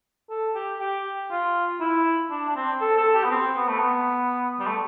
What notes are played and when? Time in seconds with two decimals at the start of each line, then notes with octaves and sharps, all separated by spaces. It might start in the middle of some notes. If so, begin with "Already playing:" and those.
0.30 A4
0.55 G4
0.80 G4
1.31 F4
1.80 E4
2.31 D4
2.49 D4
2.56 C4
2.81 A4
2.98 A4
3.15 G4
3.24 B3
3.31 C4
3.56 B3
3.68 A3
3.79 B3
4.60 G3
4.67 A3